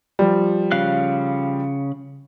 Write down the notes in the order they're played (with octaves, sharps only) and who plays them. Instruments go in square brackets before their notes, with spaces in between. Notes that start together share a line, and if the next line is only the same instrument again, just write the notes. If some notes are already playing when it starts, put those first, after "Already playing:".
[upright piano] F3 G3
[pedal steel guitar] C#3 F5 F#6